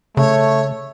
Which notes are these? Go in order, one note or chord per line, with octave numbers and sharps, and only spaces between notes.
C#3 A3 C#5